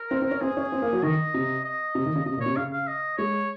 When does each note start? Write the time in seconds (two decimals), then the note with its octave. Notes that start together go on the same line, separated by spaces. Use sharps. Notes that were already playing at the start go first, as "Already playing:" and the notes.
Already playing: A#4
0.11 C4
0.22 C4
0.31 C#4
0.41 C4 G#4
0.57 C#4
0.72 C4
0.82 A#3
0.93 F#3
1.03 D#3 D#5
1.34 C3
1.65 D#5
1.95 C3
2.06 D#3
2.15 C#3
2.26 C3 D#5
2.37 A#2
2.41 C#5
2.46 C3
2.56 C#3 F5
2.73 F5
2.88 D#5
3.18 G#3 C#5